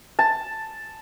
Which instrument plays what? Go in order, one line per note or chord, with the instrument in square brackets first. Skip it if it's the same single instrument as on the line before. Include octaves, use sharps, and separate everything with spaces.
[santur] A5